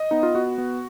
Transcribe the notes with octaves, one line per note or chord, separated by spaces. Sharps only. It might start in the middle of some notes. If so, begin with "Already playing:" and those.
Already playing: D#5
B3 D#4
F4
B3 F#4
B3